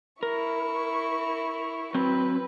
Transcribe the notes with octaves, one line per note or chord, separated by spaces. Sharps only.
E4 A#4 C#6
F#3 C4 B4